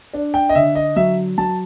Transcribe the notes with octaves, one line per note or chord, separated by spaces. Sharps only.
D4
G5
D#5
D3 E5
D#5
F#3 E5
F#3 A5